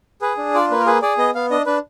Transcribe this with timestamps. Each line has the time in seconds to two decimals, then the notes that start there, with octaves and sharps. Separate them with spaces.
0.22 G#4 B4
0.38 D4
0.54 F4 D5
0.71 A#3 B4
0.80 A#4
0.86 G#4 B4
1.02 G#4 D5
1.18 B3 D#5
1.35 B3 F5
1.51 D4 D#5
1.66 D4 B4